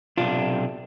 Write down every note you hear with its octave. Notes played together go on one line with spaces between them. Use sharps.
B1 C3 D4 F4